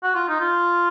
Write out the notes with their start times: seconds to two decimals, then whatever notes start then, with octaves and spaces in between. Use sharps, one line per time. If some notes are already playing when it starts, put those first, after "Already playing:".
0.03 F#4
0.15 F4
0.28 D#4
0.40 F4